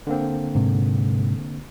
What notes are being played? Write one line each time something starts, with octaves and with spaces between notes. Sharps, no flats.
D3 A#3 C4
G#2 C3